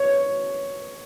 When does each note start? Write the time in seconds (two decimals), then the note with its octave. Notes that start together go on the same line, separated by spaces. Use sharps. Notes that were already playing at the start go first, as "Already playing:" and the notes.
Already playing: C#5